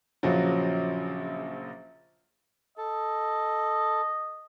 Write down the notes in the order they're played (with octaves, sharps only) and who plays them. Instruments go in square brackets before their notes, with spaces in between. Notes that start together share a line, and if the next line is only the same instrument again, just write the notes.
[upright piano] A#1 C#3 F3 F#3
[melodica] A4 [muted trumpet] D#5